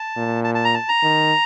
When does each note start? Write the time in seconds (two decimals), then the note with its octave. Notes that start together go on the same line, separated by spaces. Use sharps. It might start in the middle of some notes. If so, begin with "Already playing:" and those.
Already playing: A5
0.16 A#2
0.44 A5
0.55 A5
0.65 A#5
0.74 A5
0.89 A#5
1.02 D#3